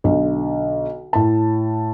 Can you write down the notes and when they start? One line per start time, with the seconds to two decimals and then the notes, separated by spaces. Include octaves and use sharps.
0.04 B1 D3
1.13 A2 A5